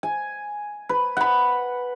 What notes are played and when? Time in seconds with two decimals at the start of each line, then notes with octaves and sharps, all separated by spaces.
0.03 G#5
0.89 B4
1.17 F#5 B5